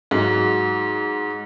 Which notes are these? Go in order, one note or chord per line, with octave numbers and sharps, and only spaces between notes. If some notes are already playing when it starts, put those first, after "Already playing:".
G#2 F#3